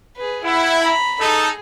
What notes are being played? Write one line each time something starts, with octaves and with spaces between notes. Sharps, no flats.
G#4 B4
E4 F#5
A#5 B5
D#4 G#4 A4